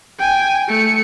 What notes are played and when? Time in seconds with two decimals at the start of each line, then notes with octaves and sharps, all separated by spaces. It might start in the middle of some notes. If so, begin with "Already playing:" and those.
0.19 G5 G#5
0.68 A3 C#7